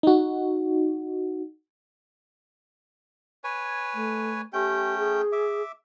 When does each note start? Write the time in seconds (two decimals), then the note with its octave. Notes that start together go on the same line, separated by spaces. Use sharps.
0.03 D#4 F#4
3.44 B4 C#5 G#5
3.94 A3
4.53 A3 C#4 G4 G5
4.97 G#4
5.32 E5 D6